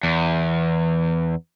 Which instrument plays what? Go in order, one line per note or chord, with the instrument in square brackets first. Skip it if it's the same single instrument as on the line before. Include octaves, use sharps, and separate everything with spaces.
[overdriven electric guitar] E2